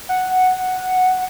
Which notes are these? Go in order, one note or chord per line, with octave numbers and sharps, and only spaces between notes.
F#5